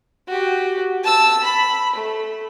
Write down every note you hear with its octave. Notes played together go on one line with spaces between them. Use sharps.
F#4 G4
A5 E6
B5
A3